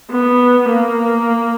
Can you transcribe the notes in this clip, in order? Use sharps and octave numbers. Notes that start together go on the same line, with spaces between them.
B3
A#3